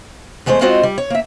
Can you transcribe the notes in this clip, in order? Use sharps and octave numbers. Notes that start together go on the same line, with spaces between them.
E2 G#3 A3 G#4 C5
G#3 C4 F4 F#4 C5 D#5
G3
C#5
A#3 E5